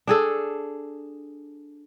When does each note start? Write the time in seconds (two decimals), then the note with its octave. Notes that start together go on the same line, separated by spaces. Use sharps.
0.07 D4 G#4 A4